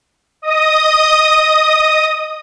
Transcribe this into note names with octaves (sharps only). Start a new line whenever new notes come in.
D#5 D#6